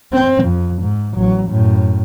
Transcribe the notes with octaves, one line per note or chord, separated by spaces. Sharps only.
C4
F2
G#2
A1 F#3
F#2 A2